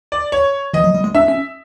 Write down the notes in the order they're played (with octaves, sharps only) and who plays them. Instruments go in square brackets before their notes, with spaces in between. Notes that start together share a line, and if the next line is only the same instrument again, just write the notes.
[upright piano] D5
C#5
[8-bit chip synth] E3 [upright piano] D#5
[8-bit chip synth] F#3
G3
G#3
[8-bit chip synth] D4 [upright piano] E5
[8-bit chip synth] C#4